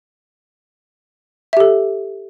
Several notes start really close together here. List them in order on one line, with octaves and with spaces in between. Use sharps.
E5 G4 A4